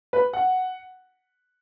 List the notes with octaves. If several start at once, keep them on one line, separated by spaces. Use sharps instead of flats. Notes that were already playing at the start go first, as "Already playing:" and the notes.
B4
F#5